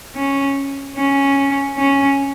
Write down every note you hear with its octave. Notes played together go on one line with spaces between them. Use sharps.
C#4
C#4
C#4